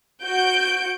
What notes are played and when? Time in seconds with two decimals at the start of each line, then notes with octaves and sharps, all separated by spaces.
0.24 F#4 G6 D7